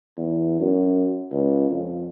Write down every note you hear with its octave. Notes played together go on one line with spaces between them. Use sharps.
E2
F#2
C#2
F2